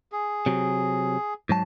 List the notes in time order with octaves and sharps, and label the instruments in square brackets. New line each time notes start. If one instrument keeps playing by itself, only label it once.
[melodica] G#4
[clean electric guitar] C3 F#3
G#2 F#3 A5